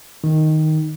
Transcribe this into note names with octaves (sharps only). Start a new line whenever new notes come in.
D#3